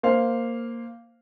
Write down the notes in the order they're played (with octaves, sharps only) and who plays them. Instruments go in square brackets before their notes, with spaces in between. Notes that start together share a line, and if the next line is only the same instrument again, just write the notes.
[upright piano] A#3 C5 F5